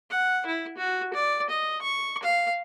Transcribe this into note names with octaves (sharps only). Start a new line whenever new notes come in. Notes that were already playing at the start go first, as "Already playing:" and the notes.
F#5
E4
F#4
D5
D#5
C#6
F5